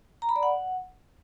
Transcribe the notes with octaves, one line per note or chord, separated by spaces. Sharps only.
A#5
B5
D5
F#5